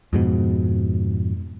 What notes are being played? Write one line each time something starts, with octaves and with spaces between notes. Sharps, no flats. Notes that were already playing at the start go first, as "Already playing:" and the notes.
F2 G#2 B2